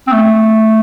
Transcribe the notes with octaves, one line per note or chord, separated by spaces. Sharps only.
C4
A3